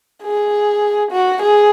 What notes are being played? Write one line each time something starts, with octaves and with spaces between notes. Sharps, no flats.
G#4
F#4
G#4